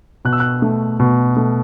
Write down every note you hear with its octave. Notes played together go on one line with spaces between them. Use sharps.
B2 F#6
E6
F#6
A3
B2
A3